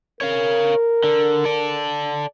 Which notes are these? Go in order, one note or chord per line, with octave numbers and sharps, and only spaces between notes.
A#4 C#5 F5
D3
A4 D5